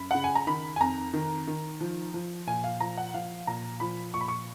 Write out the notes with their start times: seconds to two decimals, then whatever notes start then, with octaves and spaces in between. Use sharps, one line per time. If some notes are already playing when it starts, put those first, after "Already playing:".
Already playing: F#2 B5
0.11 C#3 F#5
0.24 G#5
0.35 A#5
0.47 D#3 B5
0.76 G#5
0.80 F2 A#5
1.14 D#3
1.48 D#3
1.81 F3
2.14 F3
2.47 A#2 G#5
2.64 F5
2.80 F3 A#5
2.97 F#5
3.14 F3 F5
3.47 A#2 A#5
3.80 F3 B5
4.14 A#2 C#6
4.21 B5
4.28 C#6